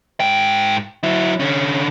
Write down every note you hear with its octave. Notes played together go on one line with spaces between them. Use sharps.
G#2 G5
F#3 E4
D3 C#4